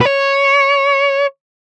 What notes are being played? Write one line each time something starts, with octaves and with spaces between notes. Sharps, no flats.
B4
C#5